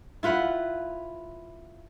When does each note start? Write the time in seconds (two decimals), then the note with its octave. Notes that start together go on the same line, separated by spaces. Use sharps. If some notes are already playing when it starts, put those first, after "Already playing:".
0.23 E4 F4 B4 F#5